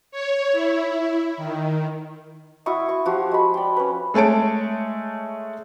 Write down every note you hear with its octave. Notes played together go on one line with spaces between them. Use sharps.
C#5
E4
D#3
E4 F#4 C#6 D#6
C#6
F3 F#4 G4
G#3 B5
D5 G5
C#4 B4
G#3 A3 C#5 A5 D7